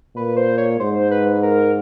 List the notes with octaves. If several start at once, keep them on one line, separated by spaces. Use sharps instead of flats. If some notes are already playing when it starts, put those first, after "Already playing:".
A#2 B4
C5
C#5
G#2 C5
B4
A#4